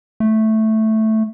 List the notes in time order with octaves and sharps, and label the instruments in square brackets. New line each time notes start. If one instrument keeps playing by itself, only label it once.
[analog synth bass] A3